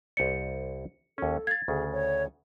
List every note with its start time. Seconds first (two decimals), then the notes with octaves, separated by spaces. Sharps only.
0.17 C2 C5 D5 C#7
1.18 D#2 C#4 A4
1.47 F5 G#6 A6
1.68 D2 C#3 G#4
1.92 C#5